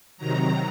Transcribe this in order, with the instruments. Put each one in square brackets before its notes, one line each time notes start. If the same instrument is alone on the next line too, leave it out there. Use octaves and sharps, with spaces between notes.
[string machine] C3 D#3 F#3 A#5